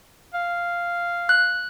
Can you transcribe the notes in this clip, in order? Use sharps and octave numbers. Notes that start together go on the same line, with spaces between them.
F5
F#6